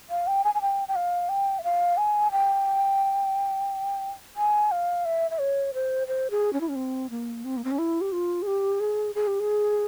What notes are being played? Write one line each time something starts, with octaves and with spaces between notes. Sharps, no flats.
F5
G5
G#5
G#5
G5
G5
F5
G5
E5
F5
G#5
G5
G#5
F5
E5
E5
C#5
C5
C5
G#4
C#4
E4
C#4
C4
A#3
C4
A#3
C4
C#4
E4
G4
F4
G#4
G4
G#4
G#4
G4
G#4